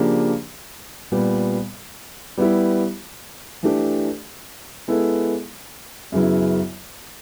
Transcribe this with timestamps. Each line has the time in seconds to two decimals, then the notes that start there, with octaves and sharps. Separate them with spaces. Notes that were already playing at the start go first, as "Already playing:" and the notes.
Already playing: C#3 F3 A#3 D4 G4
1.12 A#2 G3 B3
2.37 G3 B3 E4 G4
3.63 E3 A3 D4 G4
4.88 G#3 B3 E4 A4
6.12 F#2 C#3 F#3 B3 E4